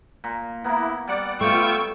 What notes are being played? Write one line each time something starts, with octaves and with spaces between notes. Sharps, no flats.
A#2
A#3 B3 E4
G3 D5 F#5 D6
A3 B3 F4 G5 C#6 E6